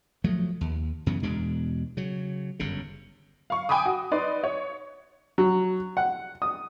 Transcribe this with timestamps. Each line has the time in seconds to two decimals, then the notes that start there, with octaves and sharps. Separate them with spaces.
0.24 F3 F#3 A3
0.61 D#2
1.06 F#2 C#3 E3 B3
1.23 E2 B2 G#3 D4
1.97 C#3 F#3
2.59 G1 F#2 C#3
3.50 F5 C#6
3.69 G5 G#5 B5 D6 D#6
3.86 F#4
4.11 D#4 B4 D5 C6
4.43 C#5
5.38 F#3
5.97 F#5
6.42 D#6